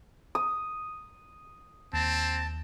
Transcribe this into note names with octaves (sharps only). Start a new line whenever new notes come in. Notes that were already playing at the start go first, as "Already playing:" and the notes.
D#6
D#2 C4 A5